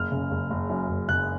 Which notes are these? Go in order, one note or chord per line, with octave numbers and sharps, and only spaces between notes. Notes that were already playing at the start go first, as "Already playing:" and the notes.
Already playing: F#1 F6
C#3
F#1
F#1
F#2
F#1
F#1 F#6